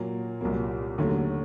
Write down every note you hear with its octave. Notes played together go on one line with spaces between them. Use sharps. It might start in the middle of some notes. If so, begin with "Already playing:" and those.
Already playing: A#2 F#3 A#3
C2 A#2 F#3 A#3
D#2 D3 F#3 A3